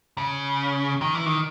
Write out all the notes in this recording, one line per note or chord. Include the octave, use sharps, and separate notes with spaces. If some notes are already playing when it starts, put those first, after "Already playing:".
C#3
D#3
E3
D#3